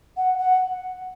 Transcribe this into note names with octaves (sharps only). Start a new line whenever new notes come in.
F#5
F#5